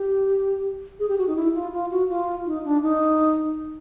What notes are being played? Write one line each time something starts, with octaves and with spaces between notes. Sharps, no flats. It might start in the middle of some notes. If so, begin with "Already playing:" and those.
Already playing: G4
G#4
G4
F#4
D#4
E4
F4
F4
F#4
F4
D#4
D4
D#4